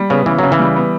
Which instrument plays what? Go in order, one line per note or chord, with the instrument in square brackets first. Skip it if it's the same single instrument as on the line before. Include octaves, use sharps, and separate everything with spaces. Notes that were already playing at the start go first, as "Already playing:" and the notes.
Already playing: [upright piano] G3
[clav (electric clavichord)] C#3 [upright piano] B3
[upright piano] C#3 [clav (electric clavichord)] E3
[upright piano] C#3 [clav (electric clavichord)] F#3
[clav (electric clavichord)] E3
[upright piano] G3
B3